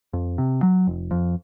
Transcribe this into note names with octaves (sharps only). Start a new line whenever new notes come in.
F2
C3
F#3
F1
F2